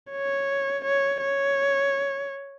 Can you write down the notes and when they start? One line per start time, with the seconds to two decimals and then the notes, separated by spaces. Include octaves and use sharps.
0.12 C#5
0.85 C#5
1.21 C#5